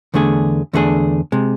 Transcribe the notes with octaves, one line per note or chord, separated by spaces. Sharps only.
E2 D3 A3 D4 G#4
E2 D3 A3 D4 G#4
C3 G#3